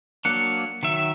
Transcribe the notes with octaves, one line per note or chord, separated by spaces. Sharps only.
F#3 A#3 D4 F#6 C#7
D#3 F#3 E5